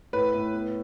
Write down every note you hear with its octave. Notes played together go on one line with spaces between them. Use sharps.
A2 B4
A2
B3